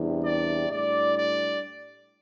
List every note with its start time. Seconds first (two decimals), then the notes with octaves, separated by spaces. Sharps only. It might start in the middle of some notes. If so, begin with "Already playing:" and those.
Already playing: E2 C3 G3 D4
0.25 D5
0.71 A2 G3 D4 D5
1.18 D5